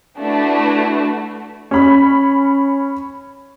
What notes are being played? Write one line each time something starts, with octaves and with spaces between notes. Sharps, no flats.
A3 D4 E4 F#4 B4
C#4 B5